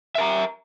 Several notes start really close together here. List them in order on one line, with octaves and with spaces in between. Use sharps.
E5 A#4 A#5